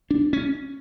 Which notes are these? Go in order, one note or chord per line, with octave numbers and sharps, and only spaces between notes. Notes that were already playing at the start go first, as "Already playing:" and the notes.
D4
C#4